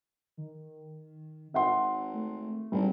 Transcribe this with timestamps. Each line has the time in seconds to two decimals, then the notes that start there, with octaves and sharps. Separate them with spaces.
0.37 D#3
1.54 G#1 E5 F#5 C6
2.14 A3
2.72 G#1 G2